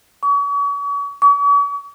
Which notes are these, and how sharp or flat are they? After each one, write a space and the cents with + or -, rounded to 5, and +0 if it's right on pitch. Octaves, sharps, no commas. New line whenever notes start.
C#6 +40
C#6 +45